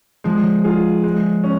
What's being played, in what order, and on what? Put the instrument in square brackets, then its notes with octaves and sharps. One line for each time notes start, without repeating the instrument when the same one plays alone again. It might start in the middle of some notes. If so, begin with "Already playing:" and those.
[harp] F3 [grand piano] G#3
[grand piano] F4 G#4
G#3
C#4